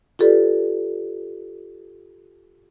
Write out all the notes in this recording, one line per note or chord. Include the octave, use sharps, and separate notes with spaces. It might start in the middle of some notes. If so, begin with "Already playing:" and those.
F4 G4 A4 B4 D5